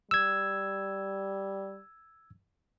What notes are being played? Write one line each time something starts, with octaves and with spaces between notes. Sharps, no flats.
G3 E6 G#6